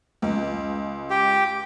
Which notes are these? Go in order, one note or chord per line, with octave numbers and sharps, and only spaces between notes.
C#2
G4